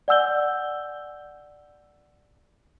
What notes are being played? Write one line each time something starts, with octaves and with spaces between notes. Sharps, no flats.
D5 F#5 G#5 E6 G6 G7